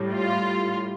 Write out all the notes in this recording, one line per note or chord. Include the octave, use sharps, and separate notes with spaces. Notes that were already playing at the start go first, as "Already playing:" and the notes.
Already playing: A2 G3
F4